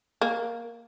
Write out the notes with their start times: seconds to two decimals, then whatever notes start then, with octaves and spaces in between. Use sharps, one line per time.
0.21 A#3